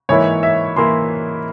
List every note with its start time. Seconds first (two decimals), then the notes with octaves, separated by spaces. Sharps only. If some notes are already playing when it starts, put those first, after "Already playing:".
0.09 G#2 E3 A#3 E4 C#5
0.43 E5
0.76 E3 A#3 E4 C6